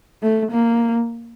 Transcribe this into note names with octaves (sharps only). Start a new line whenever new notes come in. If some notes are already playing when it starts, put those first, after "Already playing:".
A3
A#3